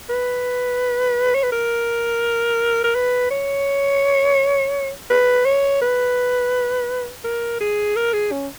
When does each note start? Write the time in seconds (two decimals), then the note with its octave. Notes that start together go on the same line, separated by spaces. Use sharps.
0.10 B4
1.35 C#5
1.43 B4
1.52 A#4
2.84 A#4
2.95 B4
3.31 C#5
5.10 B4
5.46 C#5
5.81 B4
7.24 A#4
7.61 G#4
7.96 A#4
8.14 G#4
8.32 C#4